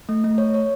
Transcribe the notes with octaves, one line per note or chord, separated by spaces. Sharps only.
A3
A3
C#5
C#5